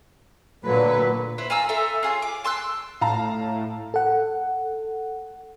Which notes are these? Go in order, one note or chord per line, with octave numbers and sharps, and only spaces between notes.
A#2 D3 F#3 B4
E4 B4 C5
F4 G#5 A#5 E6
A4 E5 A#5 C6
F4 G#4 C#5
D6
A5 C6 E6 F#6
A2 F5 A5 A#5
A4 F#5